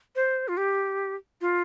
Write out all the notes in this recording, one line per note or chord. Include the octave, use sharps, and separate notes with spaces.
C5
F4
G4
F4